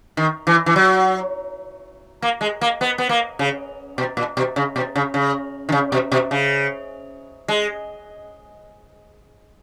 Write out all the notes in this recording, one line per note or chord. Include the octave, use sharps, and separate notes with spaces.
D#3
E3
E3
F#3
A#3
G#3
A#3
B3
B3
A#3
C#3
B2
A#2
B2
C#3
B2
C#3
C#3
D#3
C#3
B2
B2
C#3
G#3